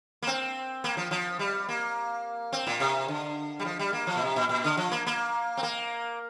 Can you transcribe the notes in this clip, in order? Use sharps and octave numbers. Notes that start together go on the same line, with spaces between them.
A#3
C4
A#3
F3
F3
G3
A#3
C4
A#2
C3
D3
G3
F3
G3
A#3
F3
A#2
C3
A#2
A#2
D3
F3
A#3
A#3
C4
A#3